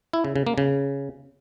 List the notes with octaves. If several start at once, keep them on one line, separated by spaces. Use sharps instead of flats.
E4
C#3
C#3
A#3
C#3